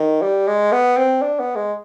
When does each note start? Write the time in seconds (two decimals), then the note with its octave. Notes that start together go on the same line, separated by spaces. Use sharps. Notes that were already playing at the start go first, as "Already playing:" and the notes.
Already playing: D#3
0.22 G3
0.48 G#3
0.72 B3
0.97 C4
1.22 D4
1.40 B3
1.56 G#3